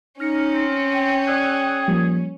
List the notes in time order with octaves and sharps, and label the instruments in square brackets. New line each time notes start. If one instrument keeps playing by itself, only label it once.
[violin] C#4 [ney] D#4 [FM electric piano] F6 A#6 C#7
[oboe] C4
[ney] G5
[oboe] G#4 [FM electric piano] D5 E6 F#6
[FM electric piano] F3 G3 A#3